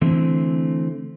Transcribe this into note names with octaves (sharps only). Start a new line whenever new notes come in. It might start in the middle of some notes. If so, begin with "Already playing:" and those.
D3 E3 A3 C4